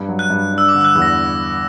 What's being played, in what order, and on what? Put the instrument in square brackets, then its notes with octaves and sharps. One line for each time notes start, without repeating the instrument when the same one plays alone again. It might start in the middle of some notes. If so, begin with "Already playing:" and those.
Already playing: [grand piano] G2
F#3
[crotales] F#6
[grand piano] G2
D4
[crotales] E6
D6
[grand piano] D3
[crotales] E6
F#6
[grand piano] E2
[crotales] A#6